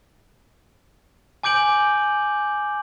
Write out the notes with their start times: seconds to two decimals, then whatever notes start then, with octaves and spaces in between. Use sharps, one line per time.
1.43 G#5 D6 G6 D7 F#7